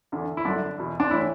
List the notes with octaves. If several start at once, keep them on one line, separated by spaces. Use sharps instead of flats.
E2 D3
E4
F#2 D3 D4
E2 B2
D4
A2 E3 E4